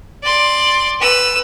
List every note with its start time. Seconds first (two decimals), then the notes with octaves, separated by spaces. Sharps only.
0.23 D5 C6
1.00 B4 E6